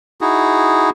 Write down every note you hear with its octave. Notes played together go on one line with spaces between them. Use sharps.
D#4 E4 F#4 G#4